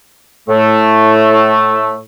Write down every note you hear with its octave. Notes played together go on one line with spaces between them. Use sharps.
A2 A3